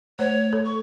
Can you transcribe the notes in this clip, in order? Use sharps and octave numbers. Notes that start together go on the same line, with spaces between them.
A3 C5 C#5
A4
C#6